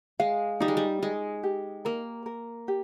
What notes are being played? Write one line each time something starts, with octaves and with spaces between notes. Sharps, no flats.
G#3 F5
G3 D#4
G#3
G3
G#3 D#4
G4
A#3 A#4
A#4
G4